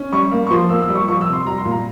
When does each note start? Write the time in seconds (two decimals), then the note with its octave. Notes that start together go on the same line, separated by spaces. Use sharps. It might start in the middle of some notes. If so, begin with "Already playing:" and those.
Already playing: C#4
0.12 G3 C#6
0.32 A#3
0.47 C#6
0.51 F3 C6
0.69 A#3 E6
0.82 E6
0.88 G3
0.95 C#6
1.08 F3 C#6
1.21 E6
1.26 C3
1.33 C6
1.45 G3 A#5
1.58 C6
1.65 A#2
1.71 A#5